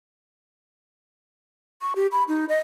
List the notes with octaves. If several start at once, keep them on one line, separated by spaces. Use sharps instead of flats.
C#6
G4
B5
D#4
D#5